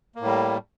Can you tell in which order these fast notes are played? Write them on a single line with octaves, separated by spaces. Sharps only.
A#3 A2 G3